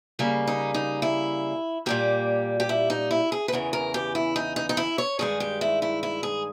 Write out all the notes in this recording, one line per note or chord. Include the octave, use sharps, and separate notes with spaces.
C#3 G3 A#3
D#4
D#4
E4
A#2 G3 A#3 G4
G4
E4
D#4
E4
G#4
B4
E2 C#3 E3 A#4
A#4
G4
E4
D#4
D#4
D#4
E4
C#5
G2 D#3 G#3 G#4
G4
E4
E4
E4
G#4